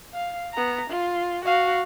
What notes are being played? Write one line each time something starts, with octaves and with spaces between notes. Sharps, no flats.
F5
B3 A#5
F4
F#4 F5